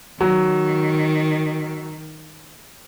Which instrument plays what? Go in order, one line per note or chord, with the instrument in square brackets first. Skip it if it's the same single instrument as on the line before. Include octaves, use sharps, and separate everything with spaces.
[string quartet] D#3 [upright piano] F#3